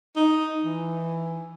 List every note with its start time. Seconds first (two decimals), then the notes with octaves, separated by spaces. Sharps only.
0.16 D#4
0.64 E3